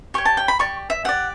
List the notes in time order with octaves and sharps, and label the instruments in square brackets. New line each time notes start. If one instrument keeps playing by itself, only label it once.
[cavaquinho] G4 C#5 C#6
A5
G5
B5
G4 D5 C#6
E5
G4 D5 F#5